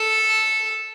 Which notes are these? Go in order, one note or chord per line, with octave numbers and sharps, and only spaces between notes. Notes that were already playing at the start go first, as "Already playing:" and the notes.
Already playing: A4